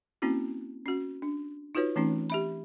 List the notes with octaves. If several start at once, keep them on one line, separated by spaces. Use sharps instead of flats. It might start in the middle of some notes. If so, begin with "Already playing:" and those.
A#3 C4 C#4 E4 F#4
C#4 F#4
D4
D#4 F4 F#4 B4 C#5
E3 A3 C4 C#4 D#4
G4 E5 B5